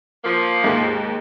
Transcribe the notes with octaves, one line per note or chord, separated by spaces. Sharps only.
F3 A#3
D#2 G#2